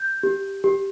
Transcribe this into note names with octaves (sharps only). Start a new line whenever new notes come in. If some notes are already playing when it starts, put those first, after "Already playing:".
Already playing: G6
G4
G4